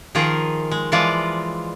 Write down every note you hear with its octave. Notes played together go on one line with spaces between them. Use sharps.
D#3 F3 F4 G#4 A#4
G#3
E3 F3 G#3 F4 D5